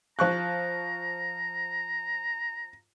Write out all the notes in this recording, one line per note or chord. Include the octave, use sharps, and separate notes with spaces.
F3 A#5 C#6 F#6